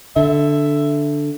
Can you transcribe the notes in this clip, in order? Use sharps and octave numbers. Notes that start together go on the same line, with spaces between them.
D3 E5